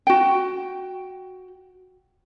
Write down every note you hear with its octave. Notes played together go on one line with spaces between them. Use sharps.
F#4 G5